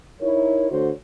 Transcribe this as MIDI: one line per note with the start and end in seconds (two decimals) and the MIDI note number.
0.21 0.69 63
0.21 0.69 64
0.21 0.69 70
0.21 0.69 73
0.71 0.90 50
0.71 0.90 57
0.71 0.90 66
0.71 0.90 72
0.71 0.90 73